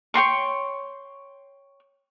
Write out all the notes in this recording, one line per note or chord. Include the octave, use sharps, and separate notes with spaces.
C#5 G5 C6 C#6